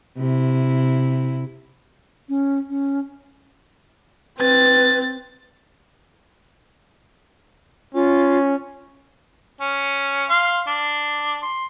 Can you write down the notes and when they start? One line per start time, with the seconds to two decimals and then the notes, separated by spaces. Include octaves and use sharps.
0.18 C3 E4
2.29 C#4
2.69 C#4
4.39 C4 B4 A6
7.94 C#4 F4
9.61 C#4
10.30 F5 C6
10.67 D4
11.42 C6